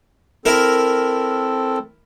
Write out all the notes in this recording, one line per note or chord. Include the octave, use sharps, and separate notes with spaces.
C4 E4 A4 A#4